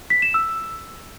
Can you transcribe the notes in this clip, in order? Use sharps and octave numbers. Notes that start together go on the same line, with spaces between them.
B6
E7
E6